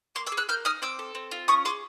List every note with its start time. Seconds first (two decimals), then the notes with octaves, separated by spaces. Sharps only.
0.15 A#3 C6 D6
0.27 D6 E6
0.32 G#4
0.37 E6 F#6
0.49 A#3 F6 G6
0.65 D#4 D#6 F6
0.82 C4 D6 E6
0.99 A4
1.15 C4
1.31 F4
1.48 C#4 C#6 D#6
1.65 G#4 C6 D6